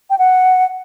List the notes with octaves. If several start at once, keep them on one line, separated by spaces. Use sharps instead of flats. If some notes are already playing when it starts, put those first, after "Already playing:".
G5
F#5